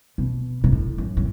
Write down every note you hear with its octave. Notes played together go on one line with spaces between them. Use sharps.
B2
B2
A2
F#2
A2